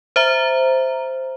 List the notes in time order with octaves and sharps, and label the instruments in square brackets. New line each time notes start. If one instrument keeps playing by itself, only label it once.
[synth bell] C5 E5 A#5